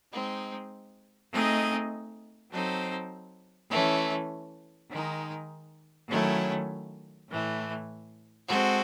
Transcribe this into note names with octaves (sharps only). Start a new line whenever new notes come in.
G#3 C4 D#4
A3 C4 D#4 G#4 D#5
F#3 C4 D#4 A4 C5
E3 A3 C#4
D#3 G#3 D#4
D#3 F#3 A3 C#4 E4
A2 E3 A3
G#3 C4 F#4 A4